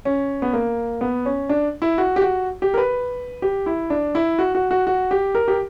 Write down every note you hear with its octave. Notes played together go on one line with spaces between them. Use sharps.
C#4
B3
A#3
B3
C#4
D4
E4
F#4
G4
F#4
G4
A#4
B4
G4
E4
D4
E4
F#4
F#4
F#4
F#4
G4
A#4
G4